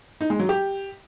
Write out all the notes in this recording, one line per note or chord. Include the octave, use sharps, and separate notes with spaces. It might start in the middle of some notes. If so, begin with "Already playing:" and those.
D#4
G#3
F#3
G4